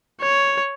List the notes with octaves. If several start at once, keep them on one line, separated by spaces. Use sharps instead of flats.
C#5